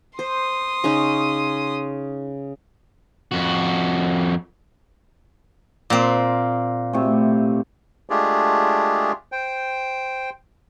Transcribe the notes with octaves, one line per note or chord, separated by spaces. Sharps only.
C5 C6 D#6
C#3 C#4 D#4
F2 F#4
A#2 C4
A2 C3
G#3 A3 D4 F4 G4 G#4
C5 G5